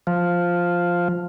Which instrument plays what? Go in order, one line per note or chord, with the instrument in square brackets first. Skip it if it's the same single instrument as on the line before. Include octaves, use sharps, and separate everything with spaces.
[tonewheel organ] F3